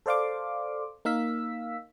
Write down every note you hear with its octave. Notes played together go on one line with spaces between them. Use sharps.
A4 C5 D5 F5 C6 D6
A#3 D#4 F5 E6 B6